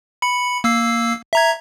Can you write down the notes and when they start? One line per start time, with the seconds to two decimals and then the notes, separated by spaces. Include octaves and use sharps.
0.22 B5 C#7
0.64 A#3 E6 C7
1.33 E5 A#5 G#6